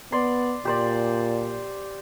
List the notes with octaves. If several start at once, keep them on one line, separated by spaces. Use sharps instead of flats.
B3 D5 C6
A#2 G4 C5 D5